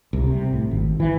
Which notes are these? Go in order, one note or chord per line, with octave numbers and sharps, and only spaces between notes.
C2
C3
A2
G#1
E3